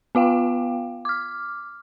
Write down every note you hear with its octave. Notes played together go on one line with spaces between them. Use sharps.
B3 F4 F5 G5
D6 F6